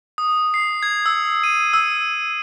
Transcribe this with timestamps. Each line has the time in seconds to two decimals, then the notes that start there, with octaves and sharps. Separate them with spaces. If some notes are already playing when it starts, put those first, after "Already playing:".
0.18 D#6
0.54 C7
0.83 G#6
1.06 E6
1.44 D#7
1.73 E6